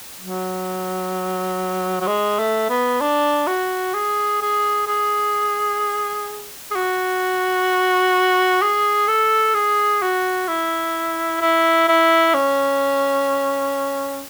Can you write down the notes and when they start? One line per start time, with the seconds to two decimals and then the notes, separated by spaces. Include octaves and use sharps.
0.20 F#3
2.01 F#3
2.07 G#3
2.39 A3
2.70 B3
3.01 D4
3.47 F#4
3.94 G#4
4.41 G#4
4.87 G#4
6.71 G#4
6.75 F#4
8.62 G#4
9.08 A4
9.54 G#4
10.02 F#4
10.48 E4
11.41 E4
11.88 E4
12.34 C#4